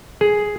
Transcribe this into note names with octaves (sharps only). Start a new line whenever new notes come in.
G#4